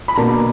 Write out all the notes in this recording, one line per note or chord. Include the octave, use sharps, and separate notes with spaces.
B5
B2 A#3 D4 A#5